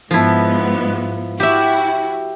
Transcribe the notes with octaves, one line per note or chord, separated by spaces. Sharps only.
G#2 F3 B3 E4
E4 F#4 G4 E5